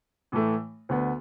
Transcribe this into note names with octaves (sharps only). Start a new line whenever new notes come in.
A2 E3 A3
D2 D3 B3